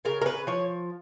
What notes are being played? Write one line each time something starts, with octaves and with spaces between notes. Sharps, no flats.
C#3 A#4
A#4
B4
F3 C#5